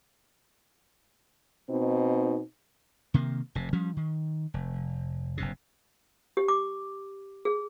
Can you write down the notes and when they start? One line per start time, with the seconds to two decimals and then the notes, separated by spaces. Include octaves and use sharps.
1.70 B2 C4 D#4
3.14 C3 D#3 A#3
3.55 F1 C3
3.73 F3 G3 C#4
3.97 D#3
4.54 F1
5.37 F#1 G2 C3
6.37 G4
6.48 D6
7.45 G#4